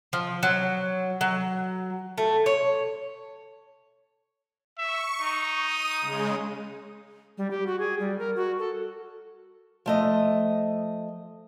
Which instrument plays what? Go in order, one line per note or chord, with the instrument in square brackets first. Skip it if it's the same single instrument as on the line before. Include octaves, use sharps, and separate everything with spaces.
[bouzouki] F3
F#3
F#3
A3
C#5
[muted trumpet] E5 [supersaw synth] C#6
[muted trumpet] D#4
[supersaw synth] D#6 D#7
C#3 G#3
[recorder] G3
G4
F#4
G#4
G3
A#4
F#4
A4
[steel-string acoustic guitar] F3 A3 D#5